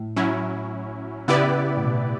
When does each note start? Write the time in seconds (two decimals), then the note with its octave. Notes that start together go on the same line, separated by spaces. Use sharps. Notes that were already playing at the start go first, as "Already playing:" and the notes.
Already playing: A2
0.16 F#3 C#4 E4
1.28 C#3 B3 E4 G4 B4 D5
1.77 A2
1.85 B2